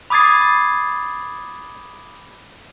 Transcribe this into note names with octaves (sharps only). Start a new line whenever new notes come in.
B5 D6 D#6 G#6 A6 C7